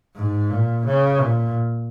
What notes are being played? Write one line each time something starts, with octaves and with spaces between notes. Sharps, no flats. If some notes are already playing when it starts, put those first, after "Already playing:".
G#2
A#2
C#3
A#2